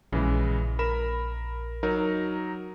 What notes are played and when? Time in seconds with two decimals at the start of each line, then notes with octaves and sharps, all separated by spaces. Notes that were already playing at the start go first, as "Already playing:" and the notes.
0.13 A#1 C#3 E3 G#3
0.79 A#4 B5 E7
1.83 F#3 D#4 A#4